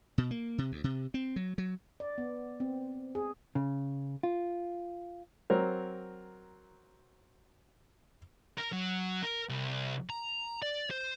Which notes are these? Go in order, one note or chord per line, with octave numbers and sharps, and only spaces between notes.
B2
A#3
C3
D2
C3
C4
F#3
F#3
D5
B3
C4
G#4
C#3
F4
F#3 C4 A#4
A#4
F#3
A#4
C2
A#5
D5
C5